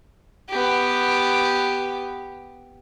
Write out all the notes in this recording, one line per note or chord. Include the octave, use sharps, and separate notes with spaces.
B3 G4